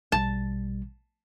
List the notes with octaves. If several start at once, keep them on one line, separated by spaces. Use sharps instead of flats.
A#1 B2 G3 A5